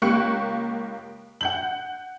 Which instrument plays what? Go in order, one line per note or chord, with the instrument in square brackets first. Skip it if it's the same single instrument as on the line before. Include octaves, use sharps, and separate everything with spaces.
[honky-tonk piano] C#2 A#3 G4 C#6 F#6 C#7
F#5 G6 F#7